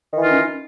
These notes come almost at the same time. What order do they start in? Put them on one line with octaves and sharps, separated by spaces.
D#3 E3 F4 D#4 C#4